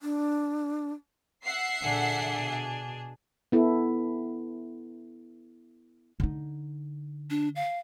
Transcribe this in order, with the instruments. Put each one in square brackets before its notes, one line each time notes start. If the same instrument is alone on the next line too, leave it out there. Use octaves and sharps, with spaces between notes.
[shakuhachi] D4
[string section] E5 F#5 C7
[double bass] A#2 D3 [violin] D4 G#4
[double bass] B2
[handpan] B3 E4 A4
[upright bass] D3 D#4
[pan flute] D4
F5